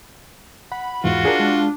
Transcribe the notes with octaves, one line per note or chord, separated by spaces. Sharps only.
F#5 B5
E2 G#2 E3 F4 F#4
D4 G#4 A#4
G#3